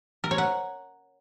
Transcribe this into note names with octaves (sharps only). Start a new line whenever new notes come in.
A#4
C#5
F#5